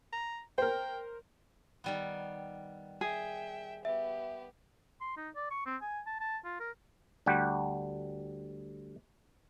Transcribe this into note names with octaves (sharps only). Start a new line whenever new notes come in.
A#5
A#4 C5 G5
D#3 G3 B3
G#4 E5 G5
B3 G4 E5
C6
D#4
D5
C#6
C4
G#5
A5
A5
F4
A#4
D2 G3 G4 F#5